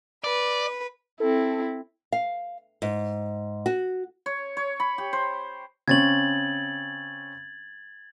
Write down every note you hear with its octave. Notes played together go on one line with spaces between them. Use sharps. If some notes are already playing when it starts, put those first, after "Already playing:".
B4 D5
C4 E4 A4
F5
G#2
F#4
C#5
C#5
B5
G4
C5
C#3 C4 C#4 G#6 A6 F#7